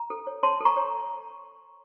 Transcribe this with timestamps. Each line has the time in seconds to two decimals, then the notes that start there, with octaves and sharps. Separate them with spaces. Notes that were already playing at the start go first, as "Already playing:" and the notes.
Already playing: A#5
0.10 A4
0.27 C#5
0.43 C#5 A5 C6
0.60 A4 A#5 C#6
0.77 C#5